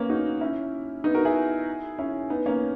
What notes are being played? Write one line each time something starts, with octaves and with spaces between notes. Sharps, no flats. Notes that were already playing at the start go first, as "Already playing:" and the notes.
Already playing: A#3 B3 C#4
D#4 F#4
C#4 E4
B3 D#4
F#4 A#4
E4 G#4
C#4 E4
B3 D#4
A#3 C#4